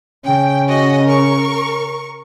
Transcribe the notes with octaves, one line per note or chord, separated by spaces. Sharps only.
C#3 C#4 G5
F#4 D#5
A#4 C#6